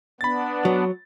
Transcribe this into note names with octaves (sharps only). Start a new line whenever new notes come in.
B3 D4 B5 A6
F#3